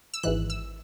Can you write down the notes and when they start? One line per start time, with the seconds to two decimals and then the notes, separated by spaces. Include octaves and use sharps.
0.14 E6
0.23 G#1 G#2 E3 F#6
0.50 E6